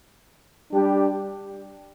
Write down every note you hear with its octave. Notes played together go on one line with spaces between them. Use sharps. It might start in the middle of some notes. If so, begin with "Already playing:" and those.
G3 D4 G4